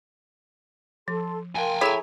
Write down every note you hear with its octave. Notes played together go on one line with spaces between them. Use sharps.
F3 A4 C6
A#4 F5 G5 G#5 C6
E4 G#4 A4 C#5 A#5